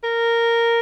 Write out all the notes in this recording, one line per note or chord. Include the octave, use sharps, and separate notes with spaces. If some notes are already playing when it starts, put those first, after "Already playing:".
A#4